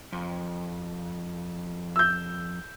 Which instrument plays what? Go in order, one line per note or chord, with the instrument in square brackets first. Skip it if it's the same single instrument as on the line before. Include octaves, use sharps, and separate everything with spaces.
[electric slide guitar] F2
[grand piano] E6 G6